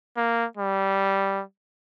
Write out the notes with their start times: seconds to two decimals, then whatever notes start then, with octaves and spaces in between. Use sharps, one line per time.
0.17 A#3
0.58 G3